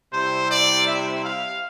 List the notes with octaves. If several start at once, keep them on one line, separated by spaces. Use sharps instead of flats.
C3 G3 C4 E4 C5
D5
E5
F5